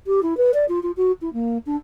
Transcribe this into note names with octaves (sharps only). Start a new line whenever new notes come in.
G4
E4
B4
D5
F4
F4
F#4
E4
A#3
D4